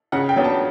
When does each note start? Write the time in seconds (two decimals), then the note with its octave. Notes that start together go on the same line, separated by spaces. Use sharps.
0.12 C#3 F#5
0.29 G5
0.36 F#3 B3 D4
0.44 A5